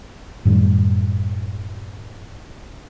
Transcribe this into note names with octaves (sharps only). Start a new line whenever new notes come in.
F#2 A2 D#3 G3